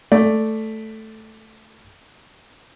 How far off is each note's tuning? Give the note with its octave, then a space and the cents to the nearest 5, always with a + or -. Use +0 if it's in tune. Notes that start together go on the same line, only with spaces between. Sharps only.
A3 +0 D5 +0